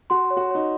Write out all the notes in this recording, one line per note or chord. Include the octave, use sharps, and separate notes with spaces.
F#4 C6
C#5
F#4
D#4 C#5